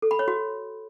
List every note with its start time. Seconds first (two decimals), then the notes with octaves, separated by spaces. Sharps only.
0.02 A4
0.11 B5
0.19 C#5
0.28 F#4